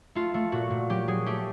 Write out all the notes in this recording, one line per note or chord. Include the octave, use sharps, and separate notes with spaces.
A3 F4
A3
A#2 F#4
A#2
F#3 G4
F#3 G#4
A3 G4